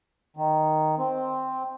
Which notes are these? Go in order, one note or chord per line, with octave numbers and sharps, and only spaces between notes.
D#3
C4